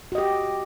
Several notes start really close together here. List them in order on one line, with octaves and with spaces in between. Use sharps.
F#4 D#5 G4